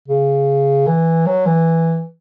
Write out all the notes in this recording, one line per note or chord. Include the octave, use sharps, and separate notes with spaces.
C#3
E3
F#3
E3